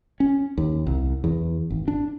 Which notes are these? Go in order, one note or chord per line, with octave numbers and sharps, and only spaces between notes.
C#4
D#2
C2
E2
G#1
D4